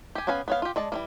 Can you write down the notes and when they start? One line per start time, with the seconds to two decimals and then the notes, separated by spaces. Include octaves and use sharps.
0.15 G4 G#5
0.27 B3 C#4 B4 F5 G#5
0.48 B3 C#5 F5
0.62 F4 G4
0.76 G#3 D5 A5
0.92 E3 G3 A#3